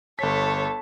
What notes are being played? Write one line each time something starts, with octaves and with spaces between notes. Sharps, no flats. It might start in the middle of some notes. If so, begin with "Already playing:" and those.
G1 A4 C#5 B6